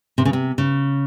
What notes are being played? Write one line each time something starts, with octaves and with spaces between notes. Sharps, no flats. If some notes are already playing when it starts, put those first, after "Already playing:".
C3
C#3
C3
C#3